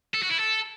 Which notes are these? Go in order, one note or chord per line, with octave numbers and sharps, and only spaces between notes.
A4
F#4
E4
A4